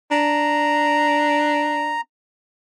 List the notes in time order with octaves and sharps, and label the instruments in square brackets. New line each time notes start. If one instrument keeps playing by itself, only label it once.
[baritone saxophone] D4 [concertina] A#5